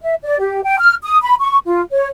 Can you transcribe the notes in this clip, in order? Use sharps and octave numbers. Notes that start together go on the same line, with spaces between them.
E5
D5
G4
G5
F6
D#6
B5
C#6
F4
C#5